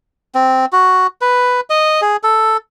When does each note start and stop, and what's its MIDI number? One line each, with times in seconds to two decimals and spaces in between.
0.35 0.66 60
0.73 1.07 66
1.21 1.61 71
1.70 2.01 75
2.01 2.17 68
2.23 2.57 69